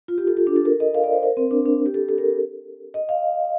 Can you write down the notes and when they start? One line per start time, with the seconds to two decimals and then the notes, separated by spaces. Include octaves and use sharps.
0.08 F4
0.18 G4
0.27 A4
0.37 F4
0.47 D4
0.56 A4
0.65 A#4
0.80 D#5
0.95 F5
1.04 D5
1.13 C5
1.23 A#4
1.37 C4
1.51 D4
1.65 D4
1.86 G4
1.94 A4
2.09 A4
2.18 A#4
2.94 D#5
3.09 F5